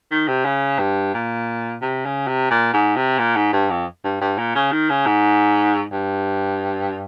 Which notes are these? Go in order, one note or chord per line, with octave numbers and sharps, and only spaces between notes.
D#3
C3
C#3
G2
A#2
C3
C#3
C3
A#2
G#2
C3
A#2
G#2
G2
F2
G2
G2
A#2
C#3
D#3
C#3
G#2
G2